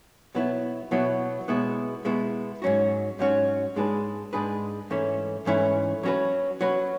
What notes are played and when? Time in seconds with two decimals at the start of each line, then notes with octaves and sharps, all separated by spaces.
0.35 B2 F#3 B3 E4
0.91 B2 F#3 B3 E4
1.48 B2 G#3 B3 E4
2.05 B2 G#3 B3 E4
2.62 G#2 F#3 C#4 F#4
3.19 G#2 F#3 C#4 F#4
3.76 G#2 G#3 D4 G#4 B4
4.33 G#2 G#3 D4 G#4 B4
4.90 G#2 E3 A3 C#4 E4
5.46 G#2 E3 A3 C#4 E4
6.03 F#3 C#4 F#4 B4
6.61 F#3 C#4 F#4 B4